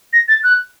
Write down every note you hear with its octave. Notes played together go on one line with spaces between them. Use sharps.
A#6
A6
F#6